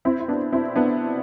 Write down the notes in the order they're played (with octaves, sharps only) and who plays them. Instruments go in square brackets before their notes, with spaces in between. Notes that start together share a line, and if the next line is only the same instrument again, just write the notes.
[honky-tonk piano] C4 E4
E4
B3 D4
C4 E4
B3 D4